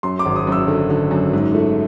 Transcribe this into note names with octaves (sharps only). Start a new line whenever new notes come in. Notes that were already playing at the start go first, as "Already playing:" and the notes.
F#2 C6
D6
G#1
D#6
F#2 E6
D3
D3
F#2
G#2
A3